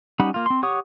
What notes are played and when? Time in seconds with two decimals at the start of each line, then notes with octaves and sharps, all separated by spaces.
0.20 G3 C#4 D#4 F#5 B5
0.34 A#3 F4
0.46 C4 C6
0.63 G4 C#5 F#5 C#6 D#6